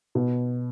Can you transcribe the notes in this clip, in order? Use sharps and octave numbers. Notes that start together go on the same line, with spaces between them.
B2